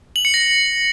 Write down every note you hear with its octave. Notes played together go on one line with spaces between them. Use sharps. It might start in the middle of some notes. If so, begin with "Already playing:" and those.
F#7
C#7
A#6